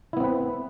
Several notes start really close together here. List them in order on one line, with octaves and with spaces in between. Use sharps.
E4 B3 C4 B4